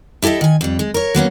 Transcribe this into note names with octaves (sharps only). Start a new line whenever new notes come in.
E4 G4 A4 D#5 E5
D#3 G#5
F2 G3
G#3
A#4 C#5
F#3 A#3 B3 C#4